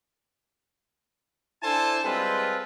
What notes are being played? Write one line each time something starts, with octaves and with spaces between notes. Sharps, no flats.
D4 E4 A4 C5 G#5 A5
G3 G#3 C4 F4 A4 B4